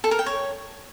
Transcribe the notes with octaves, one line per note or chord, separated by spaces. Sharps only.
A4
A#4
G5
C#5